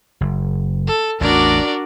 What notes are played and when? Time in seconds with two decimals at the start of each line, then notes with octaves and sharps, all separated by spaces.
0.21 F#1
0.87 A4
1.21 A1 E2 D4 F#4 A#4 D5